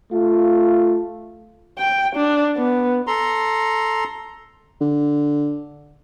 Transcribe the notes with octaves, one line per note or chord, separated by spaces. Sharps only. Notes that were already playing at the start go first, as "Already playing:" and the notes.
A3 F4
G5
D4
B3
A4 A#5 C6
D3